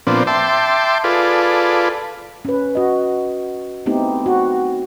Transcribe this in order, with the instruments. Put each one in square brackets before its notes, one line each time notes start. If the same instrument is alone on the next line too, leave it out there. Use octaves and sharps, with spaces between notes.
[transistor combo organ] A#2 F3 B3 C4 D4
E5 G5 A5 C6 D6
F4 G#4 A4 B4 D5
[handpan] C#4 B4
F#4 D#5
A3 B3 C4 D#4 E4 G4
F#4